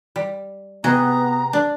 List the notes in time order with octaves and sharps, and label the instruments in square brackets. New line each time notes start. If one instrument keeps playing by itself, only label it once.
[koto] G3
[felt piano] C3 [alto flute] B3 [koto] F#4 G#4 D#5 [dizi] A#5
[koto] D4